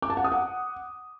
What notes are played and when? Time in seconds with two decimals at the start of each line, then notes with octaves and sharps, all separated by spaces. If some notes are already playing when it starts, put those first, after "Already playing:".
0.02 D6
0.10 A5
0.17 F#5
0.24 D#6
0.32 F#5